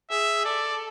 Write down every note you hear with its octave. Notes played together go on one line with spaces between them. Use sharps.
G#4 E5
A4 D5